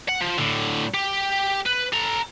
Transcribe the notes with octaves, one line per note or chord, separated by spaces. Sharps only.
F#5
F3
A2 D3
G4
B4
A4 A#5